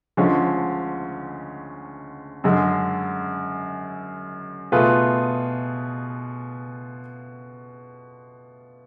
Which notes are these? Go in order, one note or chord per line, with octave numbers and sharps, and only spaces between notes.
D2 D3 F3 G#3 C#4
F#2 D3 G#3
B2 A3 F4 G#4 B4